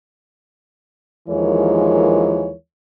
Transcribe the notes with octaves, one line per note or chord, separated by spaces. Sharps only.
D#2 E3 F3 G#3 A#4 C#5